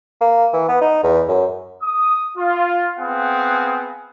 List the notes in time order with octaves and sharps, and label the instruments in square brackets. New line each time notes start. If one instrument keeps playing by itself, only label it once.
[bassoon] A#3
E3
B3
D#4
E2
F#2
[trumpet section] D#6
F4
B3 C4 G#4 F5 F#5 G#5